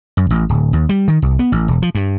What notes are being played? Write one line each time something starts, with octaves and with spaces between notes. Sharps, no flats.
F#2
A1
D1
D#2
G3
D#3
C2
B3
A1
E1
F3
G2